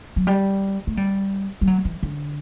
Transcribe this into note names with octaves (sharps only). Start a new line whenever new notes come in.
F#3
G3
A3
G3
G3
F#3
E3
D3